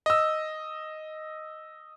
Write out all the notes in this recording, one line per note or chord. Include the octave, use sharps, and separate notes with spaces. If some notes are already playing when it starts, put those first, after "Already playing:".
D#5 E6